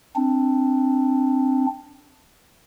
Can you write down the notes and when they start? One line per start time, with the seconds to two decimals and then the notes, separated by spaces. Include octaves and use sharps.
0.16 C4 D4